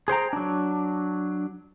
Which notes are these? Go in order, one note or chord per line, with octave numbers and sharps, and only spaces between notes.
G#4 C5 G5 A#5
F#3 D4